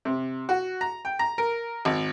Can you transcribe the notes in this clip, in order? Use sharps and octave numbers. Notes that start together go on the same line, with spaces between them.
C3
F#4
A#5
G5
A#5
A#4
G#1